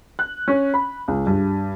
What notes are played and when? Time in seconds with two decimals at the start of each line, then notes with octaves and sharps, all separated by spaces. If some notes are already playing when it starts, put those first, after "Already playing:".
0.19 F#6
0.48 C#4
0.74 B5
1.08 C#2
1.27 G2